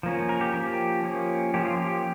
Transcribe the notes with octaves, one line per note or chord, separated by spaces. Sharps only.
F3 A#3 C#4
A#4
G4
F3 A#3 C#4 G4
F3 A#3 C#4
F3 A#3 C#4 G4
F4
G4